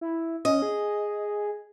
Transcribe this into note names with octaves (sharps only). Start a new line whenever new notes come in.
E4
C#4 D#5
G#4